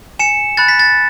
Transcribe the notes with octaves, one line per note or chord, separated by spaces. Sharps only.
G#5 C#7 E7
B5 F#6 A6
B6
A6